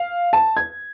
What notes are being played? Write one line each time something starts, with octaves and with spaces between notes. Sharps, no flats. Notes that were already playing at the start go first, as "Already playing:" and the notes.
Already playing: F5
A5
G#6